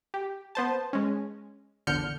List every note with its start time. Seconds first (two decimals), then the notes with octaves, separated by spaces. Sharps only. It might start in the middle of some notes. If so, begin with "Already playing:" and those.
0.14 G4
0.55 B3 C5 A5
0.93 G#3 C#4
1.87 A#1 E2 D3 F6 G6 C#7